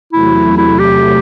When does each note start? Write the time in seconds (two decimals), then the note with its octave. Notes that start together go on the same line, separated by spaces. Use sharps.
0.13 E2 C3 F#3 A3 E4
0.57 E4
0.79 G4